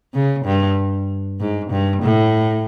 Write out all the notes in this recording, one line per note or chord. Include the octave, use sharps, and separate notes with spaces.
C#3
G2
G#2
G2
A2